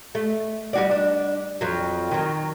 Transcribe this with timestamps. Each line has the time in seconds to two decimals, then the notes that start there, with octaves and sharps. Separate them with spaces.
0.15 A3
0.73 G3 F#4 D5
0.91 D4
1.61 F2 F#3
2.11 D#3 F#3